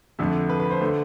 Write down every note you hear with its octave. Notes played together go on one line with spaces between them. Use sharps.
F2 D3 A3
B4
B4
C5
D3 A3